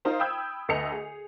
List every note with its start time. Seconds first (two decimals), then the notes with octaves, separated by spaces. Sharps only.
0.05 D#4 F4 A#4 C5 F5
0.20 G5 B5 D#6 E6 G6 G#6
0.69 D2 A4 B4 D#5 C#7 F7
0.92 G#4